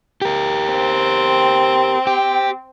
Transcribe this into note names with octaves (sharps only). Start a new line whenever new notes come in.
G4 A#4
C4
G4